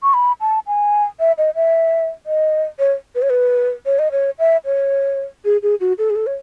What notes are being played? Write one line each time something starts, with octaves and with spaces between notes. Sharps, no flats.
C#6
B5
A5
G#5
E5
D#5
E5
D#5
C#5
B4
C#5
B4
C#5
D#5
C#5
E5
C#5
G#4
G#4
F#4
A4
G#4
A4
C#5